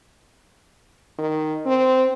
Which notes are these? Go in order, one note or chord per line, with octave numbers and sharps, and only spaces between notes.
D#3
C4